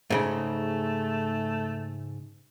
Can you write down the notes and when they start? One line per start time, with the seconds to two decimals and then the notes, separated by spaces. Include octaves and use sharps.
0.10 G#2 C#3 A3